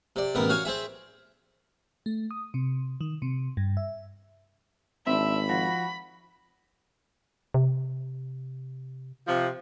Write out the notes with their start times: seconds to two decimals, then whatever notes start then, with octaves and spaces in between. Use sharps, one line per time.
0.16 C3 D5
0.35 A1 C3 B3 A#4
0.50 F#4 C#5 F5 G#5
0.65 C4 G#4 E5
2.06 A3
2.31 D#6
2.54 C3
3.01 D#3
3.22 C3
3.57 G2
3.77 E5
5.07 G#1 C4 D4 E5 B5
5.49 F3 F#4
7.54 C3
9.27 C3 F3